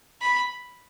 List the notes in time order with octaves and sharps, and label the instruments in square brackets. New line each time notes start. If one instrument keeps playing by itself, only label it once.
[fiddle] B5